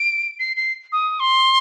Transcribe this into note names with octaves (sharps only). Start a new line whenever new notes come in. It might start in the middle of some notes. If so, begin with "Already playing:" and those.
Already playing: D7
C7
C7
D#6
C6